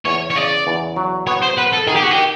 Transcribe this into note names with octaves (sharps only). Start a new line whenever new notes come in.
E2 C#5
C#5
C#3 D5
E2
F#3
B3 C#5
C5
B3 B4
A4
D#3 G#4
G4
F#4
G4
D#3